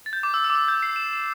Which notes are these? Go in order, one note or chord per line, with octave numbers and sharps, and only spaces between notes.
A6
G6
D6
E6
E6
D6
E6
G6
C7
E7